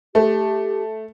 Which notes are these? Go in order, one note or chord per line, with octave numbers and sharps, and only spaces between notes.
A3 G4